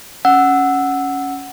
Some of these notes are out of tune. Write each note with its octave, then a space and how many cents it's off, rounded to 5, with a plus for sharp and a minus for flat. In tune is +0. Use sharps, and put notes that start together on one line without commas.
C#4 +0 F#5 +0 E6 +0